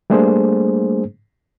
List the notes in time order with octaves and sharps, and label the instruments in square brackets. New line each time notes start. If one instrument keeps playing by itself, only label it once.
[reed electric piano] G3 A3 A#3 D4 G#4 C5